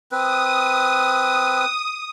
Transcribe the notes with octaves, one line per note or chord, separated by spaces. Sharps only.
C4 B4 D#6